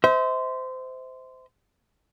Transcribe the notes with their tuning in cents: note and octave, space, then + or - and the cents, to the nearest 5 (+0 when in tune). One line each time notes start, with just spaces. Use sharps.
C5 -20 E5 -45